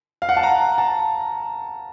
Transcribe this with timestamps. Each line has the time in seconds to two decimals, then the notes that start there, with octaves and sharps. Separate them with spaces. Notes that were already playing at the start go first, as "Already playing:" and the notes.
0.22 F5
0.29 F#5
0.37 A5
0.43 A#5
0.78 A5